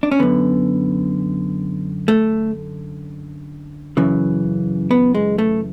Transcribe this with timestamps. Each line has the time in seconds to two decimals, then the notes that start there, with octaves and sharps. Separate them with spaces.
0.03 D4
0.11 C#4
0.19 F#2 D3 B3
2.08 A3
3.97 F#2 C#3 E3
4.91 B3
5.15 G#3
5.38 A3